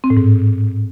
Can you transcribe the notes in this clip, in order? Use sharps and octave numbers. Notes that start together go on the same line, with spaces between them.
C4
A2
G#2